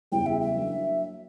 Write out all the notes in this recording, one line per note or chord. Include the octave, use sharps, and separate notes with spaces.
E2 C#3 E3 G3 G5
E5
E5
F#3 A#3 D4